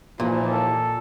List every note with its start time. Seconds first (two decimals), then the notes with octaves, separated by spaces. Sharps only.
0.20 D#2 A#2 E3 F3
0.52 A4